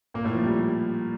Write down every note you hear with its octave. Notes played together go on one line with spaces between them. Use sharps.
A#2 A#3
A2 A3
F3
G3